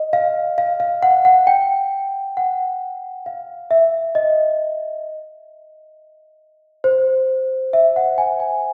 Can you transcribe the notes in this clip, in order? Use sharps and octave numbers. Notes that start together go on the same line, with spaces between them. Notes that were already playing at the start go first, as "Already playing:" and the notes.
Already playing: D#5
F5
F5
F5
F#5
F#5
G5
F#5
F5
E5
D#5
C5
E5
F#5
G#5
G#5